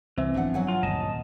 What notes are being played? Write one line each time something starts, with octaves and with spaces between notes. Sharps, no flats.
C2 E3 C4 E5
G#1 F3 B3 D4 F#5
F#3 F#5 G#5
F4
D#1 D2 G2 D#5 A5